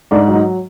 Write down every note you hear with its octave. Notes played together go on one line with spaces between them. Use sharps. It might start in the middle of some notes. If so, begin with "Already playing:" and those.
G#2 D4
F#3
D#4